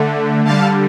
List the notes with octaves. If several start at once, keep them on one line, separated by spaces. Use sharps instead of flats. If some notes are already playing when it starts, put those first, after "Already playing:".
Already playing: D3 A3
D3 G3 F5 A5